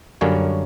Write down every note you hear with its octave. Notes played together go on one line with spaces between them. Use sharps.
F#2 D3 G3 A#3 C#4 C#5